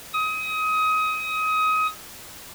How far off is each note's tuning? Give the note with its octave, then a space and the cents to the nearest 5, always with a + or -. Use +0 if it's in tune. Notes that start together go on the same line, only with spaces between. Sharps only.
D#6 +25